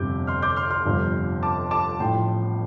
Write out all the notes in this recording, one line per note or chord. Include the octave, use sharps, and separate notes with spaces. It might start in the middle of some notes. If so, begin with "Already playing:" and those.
Already playing: G1 F2 C3 D6 G6
C6 F6
D6 G6
C6 F6
C6 F6
G1 F2 C3 F3
A5 D6
A5 D6
A1 A2 F3 G5 C6